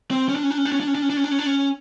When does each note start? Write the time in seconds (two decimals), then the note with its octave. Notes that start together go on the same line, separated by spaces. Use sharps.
0.11 C4
0.29 C#4
0.36 D4
0.43 C#4
0.50 D4
0.58 C#4
0.65 D4
0.72 C#4
0.80 D4
0.87 C#4
0.95 D4
1.02 C#4
1.10 D4
1.17 C#4
1.24 D4
1.31 C#4
1.39 D4
1.46 C#4